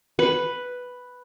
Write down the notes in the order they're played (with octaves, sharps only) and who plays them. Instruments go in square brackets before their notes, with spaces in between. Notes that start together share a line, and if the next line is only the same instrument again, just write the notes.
[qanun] B4